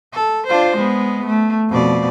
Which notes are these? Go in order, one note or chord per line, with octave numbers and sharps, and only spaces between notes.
A4
D4 F4 C5
G#3 B3
A3
F2 B2 D5